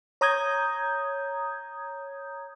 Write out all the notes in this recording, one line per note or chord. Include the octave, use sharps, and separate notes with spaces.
C#5 A#5 D#6 G6 G#6